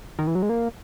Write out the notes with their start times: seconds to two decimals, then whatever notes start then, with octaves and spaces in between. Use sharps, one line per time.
0.19 D#3
0.27 E3
0.35 F#3
0.42 G#3
0.49 A#3